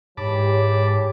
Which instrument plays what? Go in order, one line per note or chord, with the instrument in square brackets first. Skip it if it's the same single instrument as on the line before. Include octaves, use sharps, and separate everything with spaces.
[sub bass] G#2 [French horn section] E3 G#3 G4 [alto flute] C#5 [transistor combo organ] A5 B5 D6